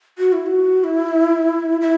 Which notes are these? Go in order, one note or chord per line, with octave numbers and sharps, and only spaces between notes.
F#4
E4
F#4
E4
E4